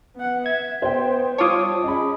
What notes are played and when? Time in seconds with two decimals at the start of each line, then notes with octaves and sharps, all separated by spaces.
0.15 B3 F#5
0.46 E5 G#6
0.82 B3 C5 G5
1.38 G3 F4 C#5 A5 D6 D#6
1.83 C#4 G#4 D#5 B5